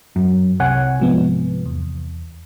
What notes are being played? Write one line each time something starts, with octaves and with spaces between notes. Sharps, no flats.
F#2
C2 C#5 F#5 G#5
G#2 F3 B3
E2